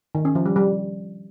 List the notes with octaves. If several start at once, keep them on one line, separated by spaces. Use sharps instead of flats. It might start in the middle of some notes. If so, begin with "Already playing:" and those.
D#3
C#4
F3
G3
G3